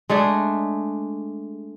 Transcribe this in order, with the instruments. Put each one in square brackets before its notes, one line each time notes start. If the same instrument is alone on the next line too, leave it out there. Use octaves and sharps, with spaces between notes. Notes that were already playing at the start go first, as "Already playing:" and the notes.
[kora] G#3 A3 D4 G#4